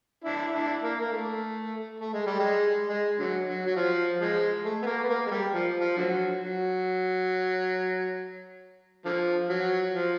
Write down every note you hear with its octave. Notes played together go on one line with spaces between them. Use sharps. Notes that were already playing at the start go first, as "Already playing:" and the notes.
D4 E4
D4 E4
A#3
A#3
A3
A3
G#3
G3
G#3
G#3
D3 F#3
F#3
F#3
F3
F3 G#3
A3
B3
A#3
B3
A#3
G#3
G3
F3
F3
D3 F#3
F#3
D3 F3
F#3
F3